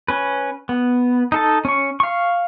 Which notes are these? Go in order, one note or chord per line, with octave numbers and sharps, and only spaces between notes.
C#4 B4
B3
D#4 A4 A5
C#4 C#6
F5 C#6